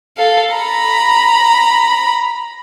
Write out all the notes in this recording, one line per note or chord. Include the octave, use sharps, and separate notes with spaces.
A4 F5
A#5 B5